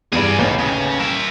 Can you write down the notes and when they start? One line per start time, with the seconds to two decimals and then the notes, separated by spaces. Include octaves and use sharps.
0.12 E2 G2 G#4 D5
0.38 A1 D#2 B2 G7
0.58 C#3
1.00 A#4 E5